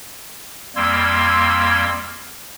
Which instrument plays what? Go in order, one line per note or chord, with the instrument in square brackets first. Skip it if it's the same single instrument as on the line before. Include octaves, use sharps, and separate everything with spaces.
[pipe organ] F2 G3 A#3 C6 E6 G#6